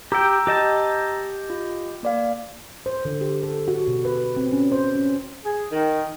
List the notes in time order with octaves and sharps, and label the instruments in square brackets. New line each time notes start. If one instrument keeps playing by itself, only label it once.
[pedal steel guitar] G4 G5 [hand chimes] A#5 E6 G6
[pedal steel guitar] G4 D#5 A5
[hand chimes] F4
A#3 D5 F5
[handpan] C5
D3
G4
A4
F#4
B2
B4
C4
C#4
C5
C#4
[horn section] G#4
D#3